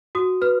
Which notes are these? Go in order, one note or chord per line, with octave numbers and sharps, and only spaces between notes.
F#4 D#6
B4 F6